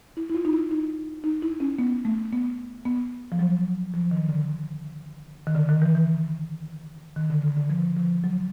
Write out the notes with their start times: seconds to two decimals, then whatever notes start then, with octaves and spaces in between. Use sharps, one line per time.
0.17 E4
0.30 E4
0.35 F4
0.45 D#4
0.53 E4
0.71 D#4
1.24 D#4
1.42 E4
1.60 C#4
1.79 B3
2.05 A3
2.33 B3
2.86 B3
3.32 F3
3.39 F#3
3.94 F3
4.11 D#3
4.29 D3
5.47 D#3
5.55 D3
5.69 D#3
5.82 E3
5.95 E3
7.16 D#3
7.30 D3
7.44 D3
7.57 D3
7.70 F3
7.97 F3
8.24 F#3